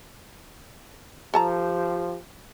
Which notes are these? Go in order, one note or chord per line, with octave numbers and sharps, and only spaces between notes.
F3 G4 A4 A5 A#5